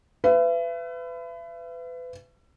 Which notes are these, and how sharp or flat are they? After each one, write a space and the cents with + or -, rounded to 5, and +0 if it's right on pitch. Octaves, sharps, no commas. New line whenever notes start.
B4 +30 E5 +40